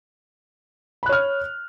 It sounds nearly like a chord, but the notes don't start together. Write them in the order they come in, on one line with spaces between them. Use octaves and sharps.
B5 F#6 C#5 F6